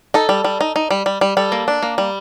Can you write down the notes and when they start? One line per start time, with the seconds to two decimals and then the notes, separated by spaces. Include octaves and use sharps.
0.14 D#4 A4
0.29 G3
0.44 G3
0.61 D#4
0.76 D#4
0.91 G3
1.06 G3
1.21 G3
1.37 G3 A4
1.52 A#3
1.68 D4
1.82 A#3
1.98 G3